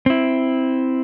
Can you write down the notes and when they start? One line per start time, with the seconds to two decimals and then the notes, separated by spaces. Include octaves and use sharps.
0.06 C4 E4